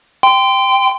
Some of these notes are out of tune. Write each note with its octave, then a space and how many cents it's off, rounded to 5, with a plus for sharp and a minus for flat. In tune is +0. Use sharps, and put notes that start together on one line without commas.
G5 +5 C6 -25